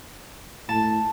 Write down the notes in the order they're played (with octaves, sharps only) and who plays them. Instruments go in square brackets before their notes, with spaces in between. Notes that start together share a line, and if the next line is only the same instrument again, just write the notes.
[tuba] A2 [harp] A5